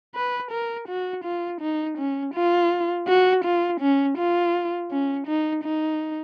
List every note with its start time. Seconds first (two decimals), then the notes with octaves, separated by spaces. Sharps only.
0.14 B4
0.51 A#4
0.88 F#4
1.24 F4
1.61 D#4
1.97 C#4
2.34 F4
3.07 F#4
3.44 F4
3.80 C#4
4.17 F4
4.91 C#4
5.27 D#4
5.64 D#4